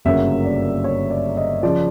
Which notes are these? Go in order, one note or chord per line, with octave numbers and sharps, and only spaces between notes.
G1 F#2 C#3 F#3 A#3 E5
D5
C#5
D5
D#5
C#3 F3 D5